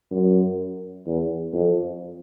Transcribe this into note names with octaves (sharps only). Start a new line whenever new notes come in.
F#2
E2
F2